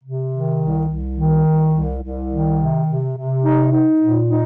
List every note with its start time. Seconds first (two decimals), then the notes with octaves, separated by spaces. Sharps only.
0.03 C3
0.30 D#3
0.59 C2
0.87 C2
1.16 D#3
1.45 C2
1.73 C2
2.01 C2
2.30 D#3
2.59 C3
2.86 C3
3.15 C3
3.43 D#4
3.72 D#4
4.00 A#2
4.29 D#4